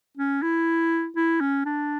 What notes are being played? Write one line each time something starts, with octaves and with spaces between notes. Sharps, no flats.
C#4
E4
E4
C#4
D4